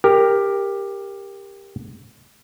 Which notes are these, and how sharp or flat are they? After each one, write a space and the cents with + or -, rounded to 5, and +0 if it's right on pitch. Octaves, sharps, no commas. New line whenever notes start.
G4 +15 A#4 +0